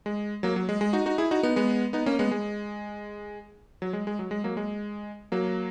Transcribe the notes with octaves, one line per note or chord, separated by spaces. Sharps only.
G#3
F#3 A#3
F#3
G#3
G#3
D#4 F#4
D#4 F#4
E4 G#4
D#4 F#4
B3 D#4
G#3 B3
B3 D#4
A#3 C#4
G#3 B3
G#3
F#3
G#3
G#3
F#3
G#3
F#3 A#3
G#3
F#3 A#3